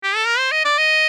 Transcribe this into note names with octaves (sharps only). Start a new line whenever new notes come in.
G4
A4
A#4
C5
D#5
D5
D#5